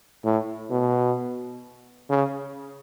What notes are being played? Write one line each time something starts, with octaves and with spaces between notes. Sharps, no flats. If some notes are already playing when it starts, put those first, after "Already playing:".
A2
B2
C#3